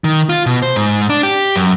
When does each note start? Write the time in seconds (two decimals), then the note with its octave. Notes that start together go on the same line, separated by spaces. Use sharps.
0.04 D#3
0.29 F4
0.46 B2
0.62 C5
0.76 G#2
1.09 D4
1.23 G4
1.56 F#2